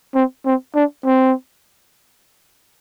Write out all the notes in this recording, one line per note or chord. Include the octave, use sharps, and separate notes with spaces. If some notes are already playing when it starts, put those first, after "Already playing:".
C4
C4
D4
C4